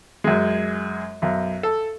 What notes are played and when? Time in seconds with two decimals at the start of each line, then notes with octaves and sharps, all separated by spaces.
0.24 F#2 G#3
1.22 B1 F#2
1.63 A4